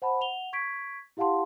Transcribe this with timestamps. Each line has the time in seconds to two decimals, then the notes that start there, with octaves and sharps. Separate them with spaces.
0.02 C5 F#5 A5 B5
0.21 F#5 F7 G7
0.53 C#6 G#6 B6 D7
1.17 E4 G4 F5 F#5 A5 C6